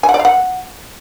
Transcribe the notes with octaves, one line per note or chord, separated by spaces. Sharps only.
G#5
F#5
D5
F5
F#5